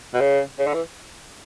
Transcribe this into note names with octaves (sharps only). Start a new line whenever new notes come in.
B2
C#3
C#3
D3
E3